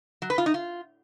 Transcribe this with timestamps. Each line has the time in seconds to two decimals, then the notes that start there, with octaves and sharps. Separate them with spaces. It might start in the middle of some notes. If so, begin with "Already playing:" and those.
0.22 F#3
0.30 B4
0.38 F4
0.46 D#4
0.54 F4